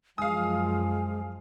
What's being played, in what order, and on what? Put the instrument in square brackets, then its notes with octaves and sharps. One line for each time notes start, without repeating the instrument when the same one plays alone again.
[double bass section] F#2 F3 [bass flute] G#3 [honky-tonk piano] F5 D#6 [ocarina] G#5